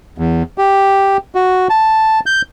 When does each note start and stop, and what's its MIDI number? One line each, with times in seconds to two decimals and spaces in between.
0.18 0.43 40
0.58 1.17 67
1.35 1.68 66
1.70 2.20 81
2.26 2.42 91